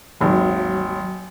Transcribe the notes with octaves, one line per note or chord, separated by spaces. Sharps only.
G#1 D#2 F#3